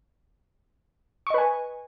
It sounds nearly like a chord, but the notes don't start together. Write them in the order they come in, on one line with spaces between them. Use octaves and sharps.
C#6 D#5 B4 G#5